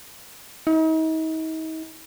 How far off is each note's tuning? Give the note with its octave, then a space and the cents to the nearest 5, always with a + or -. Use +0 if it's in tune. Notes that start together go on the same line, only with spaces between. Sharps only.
D#4 +40